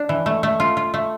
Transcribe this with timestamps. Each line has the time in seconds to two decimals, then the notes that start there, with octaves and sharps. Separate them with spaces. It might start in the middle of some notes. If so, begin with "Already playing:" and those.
Already playing: D4
0.09 E3
0.26 A3
0.43 A3
0.60 F4
0.77 F4
0.94 A3